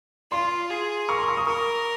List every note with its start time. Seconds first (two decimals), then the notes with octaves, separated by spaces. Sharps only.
0.31 F4 C6
0.70 G#4
1.09 A#4 C#6
1.19 C6
1.28 C#6
1.37 D#6
1.47 A#4 C#6